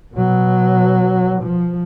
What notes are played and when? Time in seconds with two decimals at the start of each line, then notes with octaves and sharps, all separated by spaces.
0.14 B2 F#3
1.42 F3